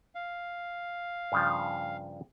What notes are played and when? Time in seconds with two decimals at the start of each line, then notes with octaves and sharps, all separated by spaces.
0.15 F5
1.32 G2 C#3 F3